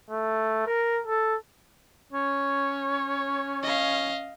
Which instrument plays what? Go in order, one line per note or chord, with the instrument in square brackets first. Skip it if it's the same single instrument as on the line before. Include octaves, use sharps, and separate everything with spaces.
[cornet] A3
A#4
A4
[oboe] C#4 [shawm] C#5
[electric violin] D#5 F5